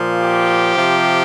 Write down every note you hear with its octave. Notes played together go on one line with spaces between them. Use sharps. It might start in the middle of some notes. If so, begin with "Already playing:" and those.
Already playing: A#2 F3
G4
C3 F3